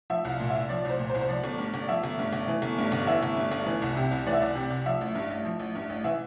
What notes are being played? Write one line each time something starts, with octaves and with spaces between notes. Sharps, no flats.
F3 E5
C2 F5
A#2
C2 E5
F3 D5
D5
C2 C5
A#2
C5
C2
C5
F3 D5
G1
G2
G1
F3 E5
G1
G2
G1
E3
G1
G2
G1
E3 E5
G1
G2
G1
E3
C2
C3
C2
E3 D5
E5
C2 D5
C3
C2
F3 E5
A1
G2
A1
F3
A1
G2
A1
E3 E5